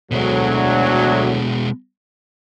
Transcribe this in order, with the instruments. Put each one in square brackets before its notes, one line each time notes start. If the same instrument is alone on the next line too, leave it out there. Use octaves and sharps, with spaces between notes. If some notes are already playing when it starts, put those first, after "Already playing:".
[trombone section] D2 F#3 [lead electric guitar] B2 G#3